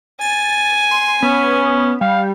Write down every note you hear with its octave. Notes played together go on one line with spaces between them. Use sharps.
G#5 A6
C6
B3 C#4
G3 F5